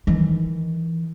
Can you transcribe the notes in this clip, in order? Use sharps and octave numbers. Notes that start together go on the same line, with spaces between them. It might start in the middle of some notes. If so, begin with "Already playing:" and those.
D#3 E3